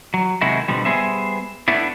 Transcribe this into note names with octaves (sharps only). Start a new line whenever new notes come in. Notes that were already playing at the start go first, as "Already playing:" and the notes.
F#3
C3 D#3 G#3 E4 F#4
B2 D3 F3 G3
G3 B3 G#4 C5 E5
A3 B3 D4 E4